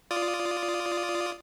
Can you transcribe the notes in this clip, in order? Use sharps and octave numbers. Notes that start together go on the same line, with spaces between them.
F4 D5 D#6